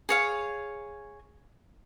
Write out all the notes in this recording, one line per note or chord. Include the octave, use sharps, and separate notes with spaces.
G#4 C#5 F5